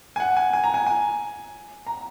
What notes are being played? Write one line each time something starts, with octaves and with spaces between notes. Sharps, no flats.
G#5
F#5
G#5
G#5
A#5
G#5
G#5
A#5